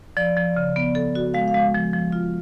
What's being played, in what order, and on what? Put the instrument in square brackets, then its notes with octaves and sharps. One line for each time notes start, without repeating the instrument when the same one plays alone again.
[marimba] F3 [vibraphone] D5
[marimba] F3
C#3
B3
A4
F#4
[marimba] G#3 [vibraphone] F5
[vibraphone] F5
[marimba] G#3
F3
F3
F4